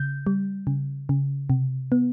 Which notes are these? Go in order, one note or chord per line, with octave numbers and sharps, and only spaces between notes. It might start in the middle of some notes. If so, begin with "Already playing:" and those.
Already playing: C#3 G6
G3
C#3
C#3
C3
B3